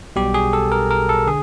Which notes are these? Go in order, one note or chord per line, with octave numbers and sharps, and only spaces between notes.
B1 B2 G3 G4
G#4
A4
A#4
A#4
A4
D3 G#4